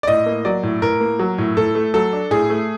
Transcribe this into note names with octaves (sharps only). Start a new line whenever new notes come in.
D5
A2 D#5
A#3
F#3 D5
A2
A2 A#4
A#3
F#3
A2
A2 A4
A3
F#3 A4
D4
A2 G#4
A3